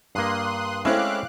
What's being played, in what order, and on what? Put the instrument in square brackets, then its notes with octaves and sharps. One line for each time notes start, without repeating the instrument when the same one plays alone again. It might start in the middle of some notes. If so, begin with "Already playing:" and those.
[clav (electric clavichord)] G2 A#3 [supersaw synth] C6 D#6 F#6
[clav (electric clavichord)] G#3 C#4 [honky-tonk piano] A3 C4 E4 [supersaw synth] F5 D6 F#6